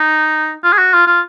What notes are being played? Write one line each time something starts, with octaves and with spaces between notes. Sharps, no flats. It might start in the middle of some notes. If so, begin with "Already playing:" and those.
Already playing: D#4
F4
G#4
F#4
F4
F4